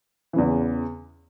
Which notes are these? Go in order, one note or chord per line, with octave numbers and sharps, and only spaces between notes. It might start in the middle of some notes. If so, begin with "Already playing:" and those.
E2 C#3 E3